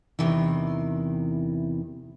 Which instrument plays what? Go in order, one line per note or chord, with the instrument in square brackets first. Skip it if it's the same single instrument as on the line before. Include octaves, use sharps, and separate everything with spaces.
[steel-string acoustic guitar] E2 C3 D#3 E3